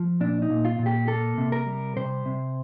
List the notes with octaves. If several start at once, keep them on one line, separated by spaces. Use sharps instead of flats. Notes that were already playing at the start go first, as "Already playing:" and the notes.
Already playing: F3
A#2 D4
D#4
A#2
F4
A#2
G4
A#3 A4
C3
A#4
G3
C3 C5
C3